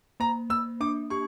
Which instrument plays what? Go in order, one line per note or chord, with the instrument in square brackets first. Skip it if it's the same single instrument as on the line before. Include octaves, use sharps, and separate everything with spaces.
[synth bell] A#3 [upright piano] A#5
[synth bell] A#3 [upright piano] E6
[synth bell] D4 [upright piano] D6
[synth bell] G4 [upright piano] C#6